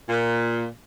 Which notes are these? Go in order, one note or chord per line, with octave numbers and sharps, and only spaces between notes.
A#2